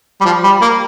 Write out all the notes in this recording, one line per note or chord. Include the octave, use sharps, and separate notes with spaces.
G3
F3
G3
A#3